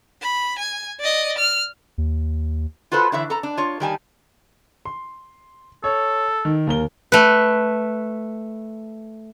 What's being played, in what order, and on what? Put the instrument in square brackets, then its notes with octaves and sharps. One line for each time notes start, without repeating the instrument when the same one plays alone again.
[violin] B5
G#5
D5 D#5
F6
[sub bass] D#2
[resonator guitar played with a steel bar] F4 F#4 A4 B4 C5
D3 E3 E4 C#5 E5
A4 A#5
D4
F4 C#5
D#3 G3 G#5 A5
[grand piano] C6
[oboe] A4 [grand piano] C#5
[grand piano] D#3
D#2 A#4 G7
[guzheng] A3 B4